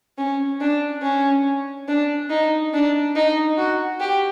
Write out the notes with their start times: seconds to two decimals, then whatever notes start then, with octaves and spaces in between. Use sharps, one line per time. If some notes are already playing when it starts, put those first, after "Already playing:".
0.18 C#4
0.61 D4
1.03 C#4
1.88 D4
2.30 D#4
2.73 D4
3.16 D#4
3.57 F#4
4.01 G4